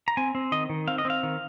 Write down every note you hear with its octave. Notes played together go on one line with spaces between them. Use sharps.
A#5
C4 G#5
C4
D#3 D#5
D#3
C4 F5
D#5
C4 F5
D#3